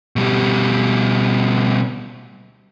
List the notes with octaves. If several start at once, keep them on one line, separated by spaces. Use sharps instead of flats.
B2 G3